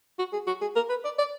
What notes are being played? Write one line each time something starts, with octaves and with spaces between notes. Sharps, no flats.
F#4
G#4
F#4
G#4
A#4
B4
D5
D5